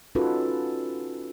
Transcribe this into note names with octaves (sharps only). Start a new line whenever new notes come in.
C#4 D#4 F4 F#4 A4 B4